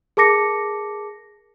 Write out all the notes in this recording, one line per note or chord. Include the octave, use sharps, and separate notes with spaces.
G#4 A#4 A5 D6 A#6 C#7